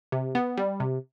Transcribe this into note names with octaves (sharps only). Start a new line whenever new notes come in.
C3
B3
G3
C3